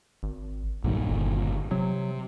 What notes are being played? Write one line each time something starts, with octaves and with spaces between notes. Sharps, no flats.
G#1
B1 G2 A#2 D#3
G1
C3 F#3